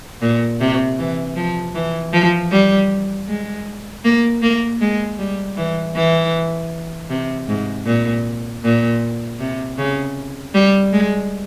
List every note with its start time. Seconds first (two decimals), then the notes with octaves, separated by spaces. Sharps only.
0.22 A#2
0.61 C3
0.99 E3
1.36 F3
1.75 E3
2.13 F3
2.52 G3
3.28 G#3
4.04 A#3
4.42 A#3
4.81 G#3
5.19 G3
5.57 E3
5.96 E3
7.10 C3
7.48 G#2
7.86 A#2
8.64 A#2
9.40 C3
9.78 C#3
10.54 G3
10.93 G#3